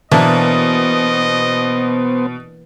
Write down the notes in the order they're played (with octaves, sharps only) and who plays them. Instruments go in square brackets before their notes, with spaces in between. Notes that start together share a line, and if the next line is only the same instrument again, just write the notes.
[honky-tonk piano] B2 [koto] E3 A#3 D4 [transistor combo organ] B3 C5 [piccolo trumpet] D#5